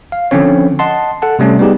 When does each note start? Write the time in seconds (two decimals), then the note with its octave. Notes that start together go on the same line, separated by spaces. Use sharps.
0.12 F5
0.31 D3 F3 C4 C#4 C#5
0.79 D#5 F#5 A5 C6
1.22 A4 F#5 A5
1.39 C3 G3 A3 C#4
1.59 G3 B3 D#4 G4 G#4